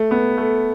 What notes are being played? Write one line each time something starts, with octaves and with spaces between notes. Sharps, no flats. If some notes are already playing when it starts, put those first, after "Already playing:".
Already playing: A3
B3
A3